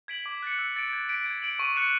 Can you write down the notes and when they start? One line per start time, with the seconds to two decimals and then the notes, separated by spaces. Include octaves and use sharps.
0.08 G#6 B6 D7 F#7
0.26 D6
0.43 F#6 A6 C#7
0.59 E6
0.76 A6 D7
0.93 G#6
1.09 B6 D7
1.26 G#6
1.42 D7 F#7
1.59 C#6
1.76 F#6 C#7 E7